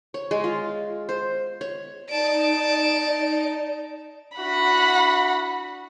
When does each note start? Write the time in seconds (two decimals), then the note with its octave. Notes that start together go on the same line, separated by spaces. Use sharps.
0.14 C#5
0.31 G#3
0.44 F4
1.09 C5
1.61 C#5
2.10 D#4 D5 A5 D7
4.38 D4 E4 F#4 F#5 B5